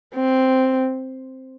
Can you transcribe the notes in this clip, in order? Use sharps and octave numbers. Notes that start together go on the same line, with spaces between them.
C4